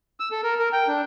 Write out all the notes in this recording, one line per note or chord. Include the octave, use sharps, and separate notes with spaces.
E6
A4
A#4
A#4
G5
D4